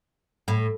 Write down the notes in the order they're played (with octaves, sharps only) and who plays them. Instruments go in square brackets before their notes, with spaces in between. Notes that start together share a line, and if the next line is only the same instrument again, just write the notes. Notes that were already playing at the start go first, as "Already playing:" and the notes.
[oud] A2